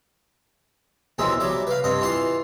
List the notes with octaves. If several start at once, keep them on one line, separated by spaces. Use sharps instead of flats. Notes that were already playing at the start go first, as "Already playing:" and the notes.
B1 E2 D#3 G#3 C4 E5
F#3 G3 D5 E5
B4 F5
G2 C4 D#5
E3 F4 A5 C6